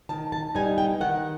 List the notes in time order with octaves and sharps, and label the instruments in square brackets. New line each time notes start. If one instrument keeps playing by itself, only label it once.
[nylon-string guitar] D#3 A5
A5
G3 B3 D#4 G#5
G5
D#3 F#5